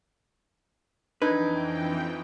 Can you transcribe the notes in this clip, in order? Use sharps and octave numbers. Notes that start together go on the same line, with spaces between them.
F2 E3 D4 D#4 B4 G5 G#6